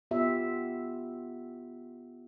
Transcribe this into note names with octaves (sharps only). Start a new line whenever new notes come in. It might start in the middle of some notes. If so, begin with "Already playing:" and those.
B3 F4 G4 E5